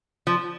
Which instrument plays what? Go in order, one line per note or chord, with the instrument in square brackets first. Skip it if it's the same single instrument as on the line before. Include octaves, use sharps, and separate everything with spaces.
[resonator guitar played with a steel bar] F3